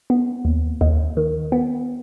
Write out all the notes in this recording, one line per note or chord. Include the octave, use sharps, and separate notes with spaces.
B3
D#2
D#2
D#3
B3